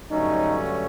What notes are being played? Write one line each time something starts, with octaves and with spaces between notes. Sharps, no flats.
G2 D3 F#3 A3 C#4 D#4